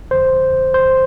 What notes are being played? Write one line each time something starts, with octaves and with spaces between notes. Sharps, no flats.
F2 D3 F3 C5
C5